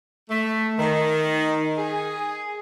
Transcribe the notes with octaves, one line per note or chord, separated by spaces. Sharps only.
A3
D#3
G#4